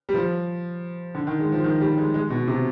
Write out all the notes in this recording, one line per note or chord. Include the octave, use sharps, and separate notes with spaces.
G3
F3
D3
D#3
G#3
F3
D#3
G3
G#3
G#3
B2
C3